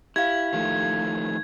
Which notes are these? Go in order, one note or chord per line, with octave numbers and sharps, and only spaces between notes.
E4 G4 F5 G#6
D#3 F3 A3